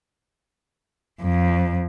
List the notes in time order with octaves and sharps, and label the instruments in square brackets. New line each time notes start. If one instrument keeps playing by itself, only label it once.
[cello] F2